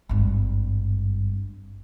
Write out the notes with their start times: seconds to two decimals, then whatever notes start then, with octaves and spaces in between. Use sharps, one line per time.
0.09 G#1 G2